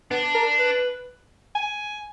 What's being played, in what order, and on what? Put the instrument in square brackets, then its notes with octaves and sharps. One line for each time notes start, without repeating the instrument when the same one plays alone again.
[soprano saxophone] B3 [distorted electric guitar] D4
[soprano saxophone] A#4
B4
G#5